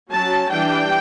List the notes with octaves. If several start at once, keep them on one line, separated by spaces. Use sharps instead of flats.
F#3 C#4 A5
E3 G3 D4 G5